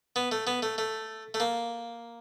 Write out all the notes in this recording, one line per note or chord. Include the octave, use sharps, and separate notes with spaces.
B3
A3
B3
A3
A3
A3
A#3